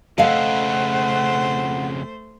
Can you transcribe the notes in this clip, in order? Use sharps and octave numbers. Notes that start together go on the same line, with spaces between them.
F2 C#3 A3 A4 C5 D#5 F5 F#5